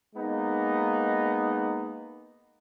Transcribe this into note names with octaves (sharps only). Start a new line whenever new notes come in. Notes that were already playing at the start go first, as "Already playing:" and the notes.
G#3 A#3 B3 D#4